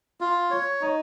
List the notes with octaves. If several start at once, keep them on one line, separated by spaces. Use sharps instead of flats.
F4
C#5
D#4